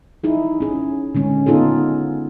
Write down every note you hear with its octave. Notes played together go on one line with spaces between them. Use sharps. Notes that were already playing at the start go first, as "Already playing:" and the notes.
D#4 E4 G#4
C#4 G#4
D3 G#3 C#4
B3 D#4 F4 G#4 A4